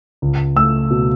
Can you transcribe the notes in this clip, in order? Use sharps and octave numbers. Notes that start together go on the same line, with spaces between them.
C#2
A3 E6
B2